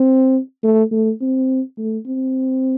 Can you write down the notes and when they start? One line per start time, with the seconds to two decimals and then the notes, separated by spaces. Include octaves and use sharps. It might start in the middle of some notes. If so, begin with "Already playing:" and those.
Already playing: C4
0.63 A3
0.92 A3
1.21 C4
1.78 A3
2.06 C4